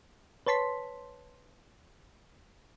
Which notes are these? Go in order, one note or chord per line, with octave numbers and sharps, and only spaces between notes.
B4 C#5 A5 C6 B6